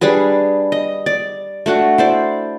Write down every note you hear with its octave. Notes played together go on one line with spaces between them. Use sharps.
G3 D4 G#4 B4
D#5
D5
A3 D4 F#4 F#5
E4 C5 D5